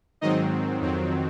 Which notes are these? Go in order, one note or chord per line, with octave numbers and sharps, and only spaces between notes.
G#2 D#3 F#3 C4 D#4 D#5
F2 D#3 F#3 C4